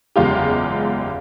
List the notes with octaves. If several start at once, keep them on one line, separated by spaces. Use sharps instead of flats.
F#1 E2 G#3 F4 G4